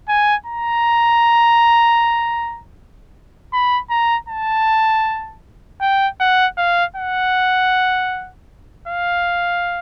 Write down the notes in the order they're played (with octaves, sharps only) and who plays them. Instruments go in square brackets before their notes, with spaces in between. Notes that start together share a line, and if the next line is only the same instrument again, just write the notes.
[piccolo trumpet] G#5
A#5
B5
A#5
A5
G5
F#5
F5
F#5
F5